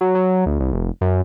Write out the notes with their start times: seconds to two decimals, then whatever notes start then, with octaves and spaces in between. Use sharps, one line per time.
0.01 F#3
0.15 F#3
0.46 D2
0.60 C2
0.73 F1
1.01 F#2